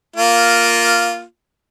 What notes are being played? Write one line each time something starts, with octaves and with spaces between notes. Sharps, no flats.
A#3 F4